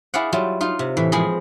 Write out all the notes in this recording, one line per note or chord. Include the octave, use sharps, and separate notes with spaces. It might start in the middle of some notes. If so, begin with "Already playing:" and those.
E4 G#4 D5 F5 F#5
F#3 G3 E4 F4
D#4 F4 F5
C3
A2 E3
F3 G#3 C4 G#4 B5